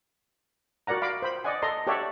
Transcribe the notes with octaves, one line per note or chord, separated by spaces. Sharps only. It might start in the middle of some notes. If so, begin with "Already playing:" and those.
F#4 A#4 D5 F#5 A#5
F5 B5 D6
C5 B5
D5 D#5 F#5 G#5
A4 D#5 A#5 C6
G4 A4 C#5 D5 E5 F#5